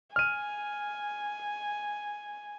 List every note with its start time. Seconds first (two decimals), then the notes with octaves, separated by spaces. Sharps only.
0.16 G#5 F6 D#7